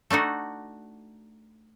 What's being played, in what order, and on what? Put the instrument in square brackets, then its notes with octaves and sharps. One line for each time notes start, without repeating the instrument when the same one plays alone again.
[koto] A3 D4 D#4 F#4